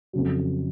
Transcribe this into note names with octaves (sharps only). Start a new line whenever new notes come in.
F2 C#3 F#3